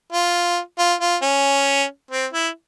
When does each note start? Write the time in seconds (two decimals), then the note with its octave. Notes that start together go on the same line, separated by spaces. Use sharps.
0.12 F4
0.78 F4
1.01 F4
1.22 C#4
2.11 C4
2.33 E4